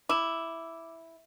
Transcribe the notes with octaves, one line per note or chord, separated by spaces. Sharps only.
E4 D6 E6 E7